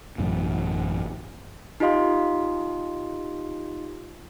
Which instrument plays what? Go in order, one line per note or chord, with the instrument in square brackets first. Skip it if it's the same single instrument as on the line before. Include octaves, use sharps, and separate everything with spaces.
[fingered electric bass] A1 F#2 B2
[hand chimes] D#4 F4 G4 D#5 F5 C6